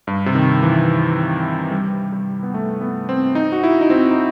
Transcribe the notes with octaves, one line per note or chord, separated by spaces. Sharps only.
G2
C3
D#3
E3
G3
G3
B3
A3
B3
C4
D#4
F#4
E4
D#4
C4
D#4